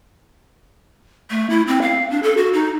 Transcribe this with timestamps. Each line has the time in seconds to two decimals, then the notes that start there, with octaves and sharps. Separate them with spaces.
1.30 A3
1.50 E4
1.68 C4
1.82 F5
2.10 D4
2.23 A4
2.37 F#4
2.53 D#4